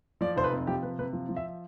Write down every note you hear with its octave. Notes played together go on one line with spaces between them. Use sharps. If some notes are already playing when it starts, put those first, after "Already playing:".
F3 D5
F1 C5
B4
C3
F3 G4
C3 B4
C3 B4
F3
F3
E5